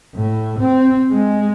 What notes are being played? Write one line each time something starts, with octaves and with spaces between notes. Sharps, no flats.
A2
C4
G#3